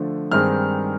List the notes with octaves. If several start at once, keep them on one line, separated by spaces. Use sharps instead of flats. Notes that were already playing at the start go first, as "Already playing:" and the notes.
Already playing: D3 F3 A3 D4
G2 D#3 G#3 C4 D#4 F6